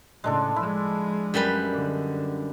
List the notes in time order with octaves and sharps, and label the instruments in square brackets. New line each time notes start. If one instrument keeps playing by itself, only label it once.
[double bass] A2 C#3 [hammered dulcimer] G#3 D4 A4
[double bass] F3 G#3 [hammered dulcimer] E4
[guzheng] F#2 G3 B4
[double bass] D3